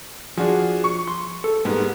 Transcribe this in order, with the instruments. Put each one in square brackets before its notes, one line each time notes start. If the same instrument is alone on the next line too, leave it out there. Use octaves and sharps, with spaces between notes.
[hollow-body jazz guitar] F3 [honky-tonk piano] D4 F#4 G#4
[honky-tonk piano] C#6
[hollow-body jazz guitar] C6
A4
[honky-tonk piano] G#2 [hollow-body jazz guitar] G3 A#3 B3